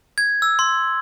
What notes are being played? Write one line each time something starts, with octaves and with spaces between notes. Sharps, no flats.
G#6
E6
C6